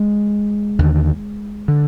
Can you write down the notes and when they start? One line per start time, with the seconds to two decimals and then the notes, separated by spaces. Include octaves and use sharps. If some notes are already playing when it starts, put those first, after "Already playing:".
Already playing: G#3
0.79 D#2 D3
1.68 D3